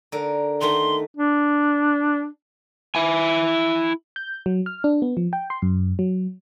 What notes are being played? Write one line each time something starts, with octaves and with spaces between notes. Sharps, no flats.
D3 A#4
D#3 A3 F#4 C6
D4
E4 G#5
G6
F#3
F6
D4
B3
F3
G5
C6
F#2
F#3